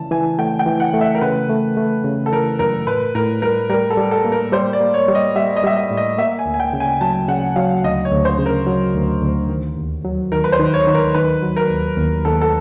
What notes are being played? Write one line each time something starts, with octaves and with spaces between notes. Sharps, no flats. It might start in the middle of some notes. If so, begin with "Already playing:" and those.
Already playing: C#3 E3 A5
E3 G#5
A3 G5
G5
E3
F#5
A3
E5
A#4
C#3 B4
A3
A3
C#3
A4
E3 A#4
F#2 A#4
A2 B4
A2 A#4
G3 A#4
G3 A#4
A4
G3
A4
A#3
A#4
G3 C5
D5
A#3
C#5
G3
D#5
G3 E5
D#5
G3 E5
D#5
A2
D#5
A#3 E5
G#5
D2
G#5
G5
C#3
G#5
F#3 A5
C#3 F#5
F#3 F5
D2 D#5
C#5
D2
C5
C#3
A#4
F#3
D2
D2
D#3
D#2
F#3
D#3 A#4
B4
C5
D#3
C#5
D#3
A#4
D#3 B4
F#3
A#4
D#2
D#2
D#2 A4
A4